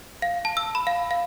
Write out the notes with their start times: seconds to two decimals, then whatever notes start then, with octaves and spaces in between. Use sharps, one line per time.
0.22 F5
0.45 A5
0.57 E6
0.75 B5
0.87 F5
1.11 F5